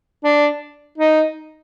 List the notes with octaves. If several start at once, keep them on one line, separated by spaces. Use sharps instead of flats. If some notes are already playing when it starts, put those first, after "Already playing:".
D4
D#4